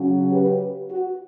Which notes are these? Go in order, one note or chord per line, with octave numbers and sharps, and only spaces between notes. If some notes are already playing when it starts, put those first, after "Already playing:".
Already playing: C#3 F#3 C#4
G4 B4
F#4